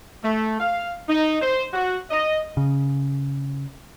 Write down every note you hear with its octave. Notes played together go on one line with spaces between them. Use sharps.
A3
F5
D#4
C5
F#4
D#5
C#3